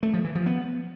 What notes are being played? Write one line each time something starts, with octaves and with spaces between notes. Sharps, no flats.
A3
F3
E3
F3
B3